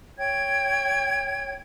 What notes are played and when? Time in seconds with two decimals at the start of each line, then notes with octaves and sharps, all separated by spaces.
0.18 C#5 G5 G#6